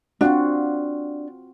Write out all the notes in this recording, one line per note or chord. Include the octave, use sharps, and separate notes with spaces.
C4 D4 F4 F#4